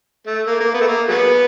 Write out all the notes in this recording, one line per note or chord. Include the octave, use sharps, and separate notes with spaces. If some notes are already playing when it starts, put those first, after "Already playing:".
A3
A#3
A#3
B3
A3
A#3
F#3 G#3 B3